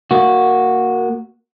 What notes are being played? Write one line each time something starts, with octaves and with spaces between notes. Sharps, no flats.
A#3 F#4